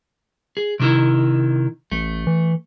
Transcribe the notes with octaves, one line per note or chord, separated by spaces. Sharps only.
G#4
C3 D#3 E4
A1 A3
E3